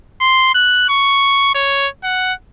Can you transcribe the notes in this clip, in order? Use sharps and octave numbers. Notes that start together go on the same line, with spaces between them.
C6
F#6
C#6
C#5
F#5